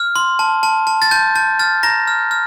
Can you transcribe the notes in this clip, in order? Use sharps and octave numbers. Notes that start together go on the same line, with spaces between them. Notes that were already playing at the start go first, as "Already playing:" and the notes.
Already playing: F6
C6
A5
A5
A5
A6
A5 G6
A5 G6
F6 A6
A#5 A#6
F6
F6